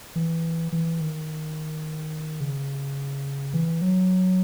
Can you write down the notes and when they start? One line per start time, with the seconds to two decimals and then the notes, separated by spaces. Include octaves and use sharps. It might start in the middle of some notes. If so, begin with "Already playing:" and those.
0.16 E3
0.72 E3
1.01 D#3
2.41 C#3
3.53 E3
3.82 F#3